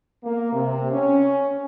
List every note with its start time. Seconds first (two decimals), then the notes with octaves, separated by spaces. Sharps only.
0.23 A#3
0.52 C3
0.92 C#4